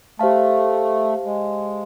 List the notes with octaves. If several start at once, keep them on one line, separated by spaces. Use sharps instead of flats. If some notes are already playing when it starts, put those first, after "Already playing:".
A3 G4 C5 F5 A5
G#3